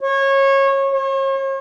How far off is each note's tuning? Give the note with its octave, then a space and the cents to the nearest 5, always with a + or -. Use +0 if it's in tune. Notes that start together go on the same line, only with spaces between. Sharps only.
C#5 -20
C#5 -40